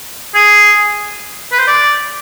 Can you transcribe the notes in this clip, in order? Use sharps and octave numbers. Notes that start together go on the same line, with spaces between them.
G#4
B4
C5
D5